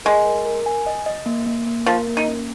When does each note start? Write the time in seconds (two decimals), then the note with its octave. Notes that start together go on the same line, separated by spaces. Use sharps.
0.05 G#3 A#4
0.26 A#4
0.46 A#4
0.66 G#5
0.86 D#5
1.06 D#5
1.26 A#3
1.47 A#3
1.66 A#3
1.86 F3 A#4
2.07 A#3
2.17 D#4
2.27 C#4